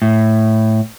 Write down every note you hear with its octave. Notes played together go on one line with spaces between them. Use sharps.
A2